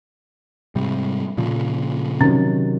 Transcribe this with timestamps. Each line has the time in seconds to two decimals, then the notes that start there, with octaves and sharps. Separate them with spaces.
0.75 G#2 C3 G3
1.37 A#2 C#3 F3
2.21 C3 D#3 F#3 C#4